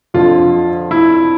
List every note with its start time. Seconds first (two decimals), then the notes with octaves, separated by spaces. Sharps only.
0.14 F2 D3 F3 F4
0.91 E4